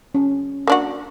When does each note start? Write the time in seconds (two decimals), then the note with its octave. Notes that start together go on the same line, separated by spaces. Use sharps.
0.15 C#4
0.67 A#3 D4 F#4